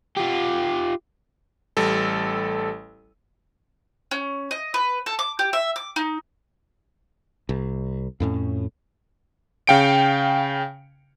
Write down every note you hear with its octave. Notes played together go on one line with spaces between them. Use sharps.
F4 G4
A1 G3 A4
C#4
D#5
B4
A4
D6
G4
E5
D6
D#4
C2
F2 A2 C#4
C#3 F5 G5 C#7 D7